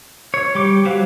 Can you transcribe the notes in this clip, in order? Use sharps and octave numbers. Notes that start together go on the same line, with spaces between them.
C#5
G3 G4 D6
F#3 G4 C5 F5 F#6